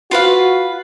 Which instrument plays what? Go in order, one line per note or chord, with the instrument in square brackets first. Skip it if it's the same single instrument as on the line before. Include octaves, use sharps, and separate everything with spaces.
[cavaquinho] F4 B4 F5 [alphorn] F#4